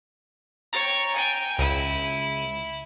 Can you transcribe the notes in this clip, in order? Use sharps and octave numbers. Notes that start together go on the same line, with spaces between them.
C#5 G5 A#5 A6
G5 G#5
C#2 E4 D#7